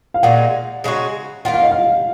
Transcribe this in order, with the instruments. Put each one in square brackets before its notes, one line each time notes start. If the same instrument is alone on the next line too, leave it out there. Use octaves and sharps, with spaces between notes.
[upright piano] F5
[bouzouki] A#2 G#3 D#4 F#4 [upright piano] F#5
[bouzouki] C#3 G#3 D#4 F#4
[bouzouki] D#3 A#3 F4 [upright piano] F#5
[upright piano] F5
D#5
F5